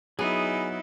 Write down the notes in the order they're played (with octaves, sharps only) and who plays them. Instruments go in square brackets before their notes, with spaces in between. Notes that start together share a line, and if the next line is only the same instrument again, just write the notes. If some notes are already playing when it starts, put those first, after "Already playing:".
[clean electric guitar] F#3 B3 [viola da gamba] D#4 E4 [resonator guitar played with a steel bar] G#4